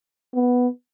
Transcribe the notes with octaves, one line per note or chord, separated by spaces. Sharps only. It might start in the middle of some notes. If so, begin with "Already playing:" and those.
B3